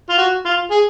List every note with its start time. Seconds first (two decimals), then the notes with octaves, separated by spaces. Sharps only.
0.10 F4
0.18 F#4
0.45 F4
0.71 G#4